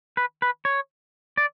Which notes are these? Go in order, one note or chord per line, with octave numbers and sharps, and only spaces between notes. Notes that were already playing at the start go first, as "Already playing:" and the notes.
B4
B4
C#5
D5